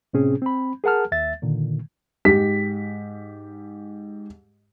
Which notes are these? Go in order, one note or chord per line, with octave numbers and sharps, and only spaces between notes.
A2 C3 C4 C#4 G#4
C4 B5
G#4 A#4 F#5 A5 F6
D#2 E5 A6
A#2 D3 D#3
G#2 G4 B6